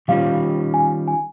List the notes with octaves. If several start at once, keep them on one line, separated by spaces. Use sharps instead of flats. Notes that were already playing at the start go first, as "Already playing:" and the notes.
D#3 G3 C#4 F4 F5
G#5
G#5